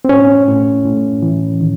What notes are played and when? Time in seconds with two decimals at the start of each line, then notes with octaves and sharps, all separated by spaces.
0.05 C4
0.09 A2 C#4
0.48 A2
0.85 A2
1.22 E3
1.60 D#3